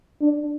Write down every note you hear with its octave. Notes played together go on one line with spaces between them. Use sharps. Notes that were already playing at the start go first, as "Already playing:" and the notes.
D4